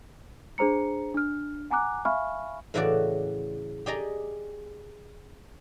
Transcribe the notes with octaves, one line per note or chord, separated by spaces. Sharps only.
D4 G#4 C5 A#5 C#7
D4 F6
F#5 G#5 A#5 D6 F#6
E5 F5 G#5 B5 C#6 F6
A2 C#3 E3 E4 F#4 D5
G4 G#4 D5 D#5 A#5